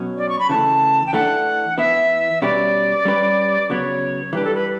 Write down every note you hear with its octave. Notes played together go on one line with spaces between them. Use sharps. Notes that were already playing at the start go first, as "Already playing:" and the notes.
Already playing: B2 F#3 C#4
D5
C#6
B5
C#3 E3 A3 A5
G5
E3 A3 D4 A4 F#5
E3 B3 E4 E5
B2 G3 C#4 G4 B4 D5
G3 C#4 G4 B4
C#3 F#3 B3 C#5
E3 G3 D4 G4 B4
A4
B4